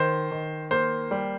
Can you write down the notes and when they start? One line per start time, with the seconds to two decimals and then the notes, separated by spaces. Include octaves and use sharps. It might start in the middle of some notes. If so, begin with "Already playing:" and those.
Already playing: D#3 C5
0.31 D#3
0.71 A#3 C5
1.11 G3